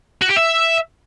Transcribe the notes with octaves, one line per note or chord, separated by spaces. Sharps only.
F#4
G4
E5